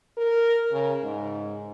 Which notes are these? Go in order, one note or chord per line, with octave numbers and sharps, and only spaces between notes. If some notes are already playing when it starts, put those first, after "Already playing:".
A#4
C#3
G#2